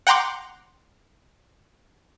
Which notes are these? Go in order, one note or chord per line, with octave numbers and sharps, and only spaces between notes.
F#5 G5 A#5 C6 D6